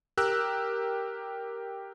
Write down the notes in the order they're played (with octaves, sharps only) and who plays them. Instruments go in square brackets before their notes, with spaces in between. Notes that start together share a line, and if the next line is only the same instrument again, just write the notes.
[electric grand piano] G4 A#4 E6 F#6